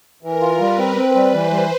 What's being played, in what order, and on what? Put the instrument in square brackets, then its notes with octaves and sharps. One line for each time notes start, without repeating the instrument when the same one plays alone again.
[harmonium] E3 [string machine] A#4
[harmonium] F4
[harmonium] G3 [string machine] B4
[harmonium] C4
C4
G3
[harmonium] E3 [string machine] C5
[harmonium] G3